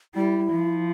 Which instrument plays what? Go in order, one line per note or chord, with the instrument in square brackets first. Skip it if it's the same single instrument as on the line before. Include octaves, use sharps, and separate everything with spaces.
[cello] G3 [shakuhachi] E4
[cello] F3